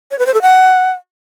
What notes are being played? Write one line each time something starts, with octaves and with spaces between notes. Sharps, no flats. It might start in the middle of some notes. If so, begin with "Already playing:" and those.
C#5
B4
C5
A4
F#5